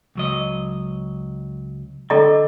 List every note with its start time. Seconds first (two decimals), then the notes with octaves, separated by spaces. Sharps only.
0.15 C#2 F#3 D#5
2.10 D3 A4 D#5 A#5